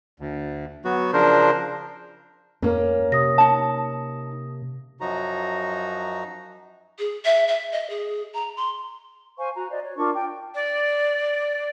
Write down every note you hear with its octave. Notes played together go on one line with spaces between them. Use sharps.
D2
F#3 B3 F#4
C#3 F3 D4 A#4 C5
F2 A#3 C#4
C3 D#6 A#6
D#4 A5
F#2 F3 F#3 D#4 F#4 A#5
G#4
E5
E5
D#5
G#4
A#5
C6
C5 F5 G#5 C#6
F#4 A#5
C5 D5 D#5
C#5
D4 F4 A#4 C#6
G5
D5